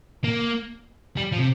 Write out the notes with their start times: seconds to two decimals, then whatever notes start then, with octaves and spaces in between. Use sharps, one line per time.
0.24 A#3
1.17 G3
1.32 F3
1.38 C3